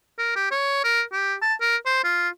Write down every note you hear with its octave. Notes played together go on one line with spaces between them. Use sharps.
A#4
G4
C#5
A#4
G4
A5
A#4
C5
F4